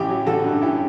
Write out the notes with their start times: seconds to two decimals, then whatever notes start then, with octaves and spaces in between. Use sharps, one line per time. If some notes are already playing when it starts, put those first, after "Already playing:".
Already playing: A1 E4 G4
0.09 F#3
0.26 A1 F#4 A4
0.44 G2
0.61 F#2 E4 G4